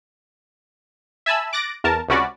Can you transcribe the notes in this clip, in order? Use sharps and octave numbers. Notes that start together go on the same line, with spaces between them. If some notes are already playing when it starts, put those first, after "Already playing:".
E5 G#5 A5 B5 E6
D6 F#6 A6 A#6 D7
E2 A#4 A5
C#2 C3 C#4 F#4 D5 B5